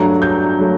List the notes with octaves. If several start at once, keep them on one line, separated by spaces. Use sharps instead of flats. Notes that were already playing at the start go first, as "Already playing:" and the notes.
Already playing: G2 F#3 A3 A#5
G6
F#3 A3